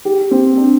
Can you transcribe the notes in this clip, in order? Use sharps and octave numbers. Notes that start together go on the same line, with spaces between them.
G4
C4
D4